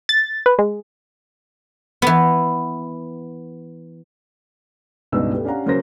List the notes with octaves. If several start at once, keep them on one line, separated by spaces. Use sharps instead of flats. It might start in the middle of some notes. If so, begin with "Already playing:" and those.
A6
B4
G#3
E3 B3
C#2 G2 B2 D#4 B4 E6
A3 B3 G4
C#4 D4 G4 F5 F#5 A#5
C#3 F#3 A#3 A#4 C5 A#6